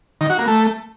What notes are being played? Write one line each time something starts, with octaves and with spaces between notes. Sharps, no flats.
D#3
F#4
A#3
A3